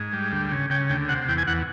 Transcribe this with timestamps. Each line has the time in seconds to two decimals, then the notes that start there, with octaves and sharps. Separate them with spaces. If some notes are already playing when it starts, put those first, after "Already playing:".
Already playing: G#2
0.13 G3
0.32 D2
0.51 C#3
0.70 C#3 G5
0.90 D2 G5
1.09 C3 F#5
1.28 E2 G5
1.38 G#5
1.47 E2 F#5